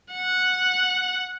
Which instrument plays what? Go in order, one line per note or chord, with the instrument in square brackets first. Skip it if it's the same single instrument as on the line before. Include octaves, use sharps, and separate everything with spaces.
[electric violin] F#5